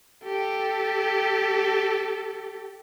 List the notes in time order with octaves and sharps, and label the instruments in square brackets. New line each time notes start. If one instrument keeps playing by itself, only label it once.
[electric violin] G4 A4